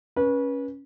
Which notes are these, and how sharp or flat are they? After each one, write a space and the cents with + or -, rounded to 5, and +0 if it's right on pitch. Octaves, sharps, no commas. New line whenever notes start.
C#4 +0 B4 -30